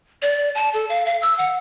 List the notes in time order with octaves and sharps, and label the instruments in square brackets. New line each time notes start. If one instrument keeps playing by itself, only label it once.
[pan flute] D5
A5
A4
F5
F5
E6
F#5